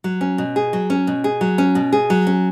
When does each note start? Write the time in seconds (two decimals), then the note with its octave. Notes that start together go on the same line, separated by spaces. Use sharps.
0.04 F#3
0.21 C#4
0.38 B2
0.56 G#4
0.73 F#3
0.90 C#4
1.07 B2
1.24 G#4
1.41 F#3
1.58 C#4
1.75 B2
1.93 G#4
2.10 F#3
2.27 C#4